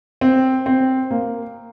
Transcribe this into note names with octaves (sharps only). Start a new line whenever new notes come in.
C4
C4
A#3